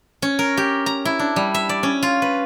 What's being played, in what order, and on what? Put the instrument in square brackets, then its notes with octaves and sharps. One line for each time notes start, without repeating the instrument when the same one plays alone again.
[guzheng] C#4
A#4
G4
A#5
E4
D4
G3
E5
D5
C#4
F4
B4